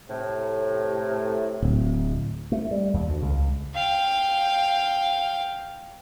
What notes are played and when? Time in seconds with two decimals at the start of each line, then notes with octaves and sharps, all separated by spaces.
0.09 A2 C3
1.63 D1
2.52 A3
2.71 G3
2.94 D#2
3.07 D2
3.22 C#2
3.75 F5 G5